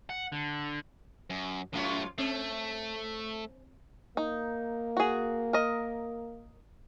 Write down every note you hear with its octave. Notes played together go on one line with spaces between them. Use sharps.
F#5
D3
F#2
F#2 A2 A3 F4 C#5
A3 C4
A#3 D#4
F#4 G#4
A#4 D#5